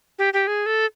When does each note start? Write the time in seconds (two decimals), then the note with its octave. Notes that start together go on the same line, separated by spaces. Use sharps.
0.19 G4
0.33 G4
0.47 G#4
0.66 A4